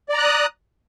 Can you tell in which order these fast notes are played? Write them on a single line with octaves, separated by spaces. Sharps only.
D5 A#5 F#6 D#6